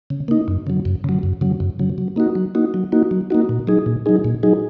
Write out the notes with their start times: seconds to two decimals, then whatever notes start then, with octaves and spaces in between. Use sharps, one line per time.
0.10 C#3
0.28 A#3 D#4
0.48 F#2
0.67 C#3 F#3
0.85 F#2
1.04 C#3 F#3
1.23 F#2
1.41 C#3 F#3
1.60 F#2
1.79 C#3 F#3
1.98 F#3
2.16 A#3 D#4 F#4
2.35 F#3
2.55 A#3 D#4 F#4
2.74 F#3
2.92 A#3 D#4 F#4
3.11 F#3
3.30 A#3 D#4 F#4
3.49 A#2
3.67 F#3 D#4 G#4
3.86 A#2
4.06 F#3 D#4 G#4
4.25 A#2
4.43 F#3 D#4 G#4